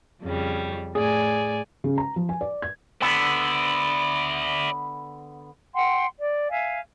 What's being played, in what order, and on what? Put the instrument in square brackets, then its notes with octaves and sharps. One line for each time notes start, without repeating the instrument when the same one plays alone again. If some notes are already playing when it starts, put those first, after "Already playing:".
[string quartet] F2 C#3 G3
[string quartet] A2 D5 G#5 [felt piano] G#4
[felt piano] C#3
A#5
F3
G#5
D5
G#6
[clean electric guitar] D3 B3 [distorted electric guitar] D5 E5
[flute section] F#5 G5 C6
D5
E5 F5 G#5